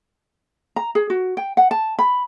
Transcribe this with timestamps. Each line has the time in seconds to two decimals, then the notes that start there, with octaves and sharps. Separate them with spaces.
0.76 A#5
0.95 G#4
1.10 F#4
1.37 G5
1.57 F#5
1.71 A5
1.99 B5